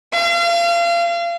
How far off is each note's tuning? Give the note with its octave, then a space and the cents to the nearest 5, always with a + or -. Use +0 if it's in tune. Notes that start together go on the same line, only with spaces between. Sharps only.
F5 -35